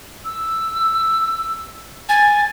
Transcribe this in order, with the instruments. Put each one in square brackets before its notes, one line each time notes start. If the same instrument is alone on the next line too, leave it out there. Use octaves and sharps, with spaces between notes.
[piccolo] E6
[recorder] G#5 [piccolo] A6